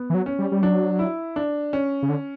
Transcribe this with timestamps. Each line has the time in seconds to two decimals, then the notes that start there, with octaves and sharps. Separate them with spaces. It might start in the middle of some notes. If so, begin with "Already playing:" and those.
Already playing: B3
0.10 E3
0.14 F#3
0.26 C#4
0.39 G3
0.52 G3
0.62 F#3 D4
0.99 E4
1.36 D4
1.73 C#4
2.02 C#3
2.09 D3